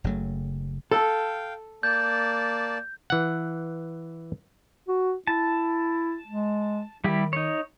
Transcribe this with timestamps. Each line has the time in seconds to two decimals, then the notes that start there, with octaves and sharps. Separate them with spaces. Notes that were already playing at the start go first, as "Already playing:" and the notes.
0.04 F#1 C#3 F#3 A3
0.91 A4 F5 G5
1.83 A#3 D5 A5 G6
3.10 E3 F#5
4.88 F#4
5.27 E4 A5
6.27 G#3
7.04 D#3 G3 E4 G4
7.33 D#4 C#5